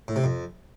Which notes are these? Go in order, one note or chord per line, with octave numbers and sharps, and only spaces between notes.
A2
C3
F2